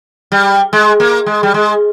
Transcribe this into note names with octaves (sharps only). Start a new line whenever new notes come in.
G3
G#3
A#3
G#3
G3
G#3